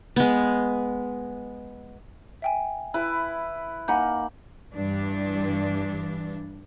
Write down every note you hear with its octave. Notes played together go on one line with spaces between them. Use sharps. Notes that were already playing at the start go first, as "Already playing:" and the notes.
G#3 B3
E5 G5 G#5
E4 B4
A#3 D#4 F#5 G#5 B5 G6
G2 E3 D4